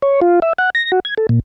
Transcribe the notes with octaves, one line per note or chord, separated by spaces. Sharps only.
C#5
F4
E5
F#5
A#6
F#4
G#6
A4
A#2